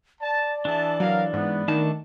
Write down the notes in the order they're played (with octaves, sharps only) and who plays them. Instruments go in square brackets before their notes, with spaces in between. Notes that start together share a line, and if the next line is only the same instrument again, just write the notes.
[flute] D5 [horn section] A5
[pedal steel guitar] E3 D4 [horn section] G#4 E5 A5
[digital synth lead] F#3 [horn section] A#4 F5
[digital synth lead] G#2 [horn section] B3
[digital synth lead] D#3 [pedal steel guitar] A3 D4 A5